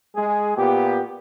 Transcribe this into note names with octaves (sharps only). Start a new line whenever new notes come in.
G#3 G#4
A#2 B3 G4